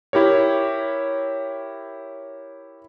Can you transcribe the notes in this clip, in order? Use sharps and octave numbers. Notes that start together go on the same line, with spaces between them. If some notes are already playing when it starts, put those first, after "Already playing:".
E4 G4 A#4 C#5